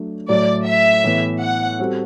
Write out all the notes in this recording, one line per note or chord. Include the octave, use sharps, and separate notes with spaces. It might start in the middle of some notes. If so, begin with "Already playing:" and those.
Already playing: F#3 A3 D4
A2 F#3 A3 D5
E5
A2 E3 B3
F#5
G3 C4 F#4 A4